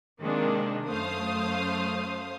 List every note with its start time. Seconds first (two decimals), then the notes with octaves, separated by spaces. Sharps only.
0.22 C3 D#3 G#3 A#3 C4 D4
0.88 F#2 A3 C5 F5 D#6